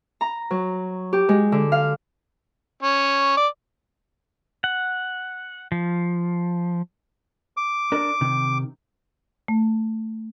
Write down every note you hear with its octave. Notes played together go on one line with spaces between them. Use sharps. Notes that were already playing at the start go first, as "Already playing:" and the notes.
A#5
F#3
G4
G#3
D3
F5
C#4
D5
F#5
F3
D6
D4 A#4
C3 D#3
A3